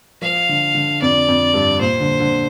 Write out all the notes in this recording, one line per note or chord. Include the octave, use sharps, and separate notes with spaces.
F3 F5
D3
D3
F2 D5
F2
G2
A#2 C5
D3
D3